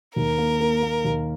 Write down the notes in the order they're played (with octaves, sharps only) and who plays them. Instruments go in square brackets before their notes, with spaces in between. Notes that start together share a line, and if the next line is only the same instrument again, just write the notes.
[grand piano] D#2 [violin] A#4
[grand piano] A#3
A#3
A#3
D#2